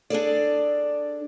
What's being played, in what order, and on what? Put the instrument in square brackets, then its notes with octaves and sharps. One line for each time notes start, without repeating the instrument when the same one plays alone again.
[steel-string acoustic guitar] D4 G#4 A4 D5